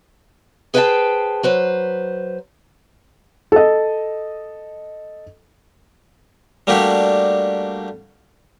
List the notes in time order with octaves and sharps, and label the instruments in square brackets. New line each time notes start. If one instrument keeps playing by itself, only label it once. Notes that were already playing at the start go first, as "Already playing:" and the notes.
[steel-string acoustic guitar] G#4 B4 C5 D#5 G5 A5
F#3 B4 C5
[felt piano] A4 D#5
[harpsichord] G3 A3 A#3 D4 F#4 G4